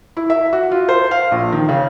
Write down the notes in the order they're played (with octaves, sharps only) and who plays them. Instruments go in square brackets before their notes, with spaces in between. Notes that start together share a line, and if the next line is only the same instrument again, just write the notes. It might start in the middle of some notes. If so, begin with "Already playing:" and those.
[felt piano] E4
E5
F#4
F4
C5
F5
A#1
D#3
C#3